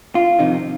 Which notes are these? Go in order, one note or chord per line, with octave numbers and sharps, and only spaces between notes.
F4
F2 C3 D#3 D#4